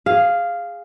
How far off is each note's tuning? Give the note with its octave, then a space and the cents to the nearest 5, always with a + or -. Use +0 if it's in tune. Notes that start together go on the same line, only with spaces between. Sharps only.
G#4 -10 F5 +0